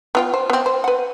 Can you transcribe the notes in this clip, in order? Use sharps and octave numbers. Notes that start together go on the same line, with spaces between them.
B3 F4 G5
C5
B3 C4
C5
B4 F#5